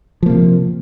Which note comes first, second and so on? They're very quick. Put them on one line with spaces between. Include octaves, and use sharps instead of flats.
F3 A#3 C3